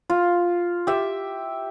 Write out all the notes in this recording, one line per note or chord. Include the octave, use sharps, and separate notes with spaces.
F4
G4 E5